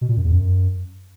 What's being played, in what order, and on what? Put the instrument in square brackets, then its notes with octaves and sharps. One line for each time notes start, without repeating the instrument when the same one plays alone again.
[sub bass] B2
A#2
F#2
E2
F#2